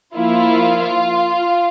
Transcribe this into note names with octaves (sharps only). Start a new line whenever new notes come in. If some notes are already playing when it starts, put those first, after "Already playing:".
F3 A#3 E4 F4